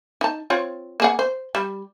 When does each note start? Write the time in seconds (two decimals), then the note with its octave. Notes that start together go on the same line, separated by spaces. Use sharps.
0.21 D#4 A5
0.50 C4 F4 C#5
1.00 A#3 G#4 F#5
1.19 C5
1.55 G3